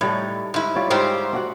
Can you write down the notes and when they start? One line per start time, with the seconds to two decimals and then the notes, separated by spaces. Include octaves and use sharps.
0.01 A2 G3 D#4 C#5
0.54 G#2 E4
0.75 G3 F4 C#5
0.90 G#2 G4 C5
1.33 D4 F#4 F#5